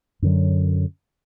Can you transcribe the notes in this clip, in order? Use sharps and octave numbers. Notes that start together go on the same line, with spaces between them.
F#2 D3 F#3